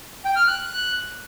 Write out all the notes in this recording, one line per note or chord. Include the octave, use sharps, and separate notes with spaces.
G5
F6
F#6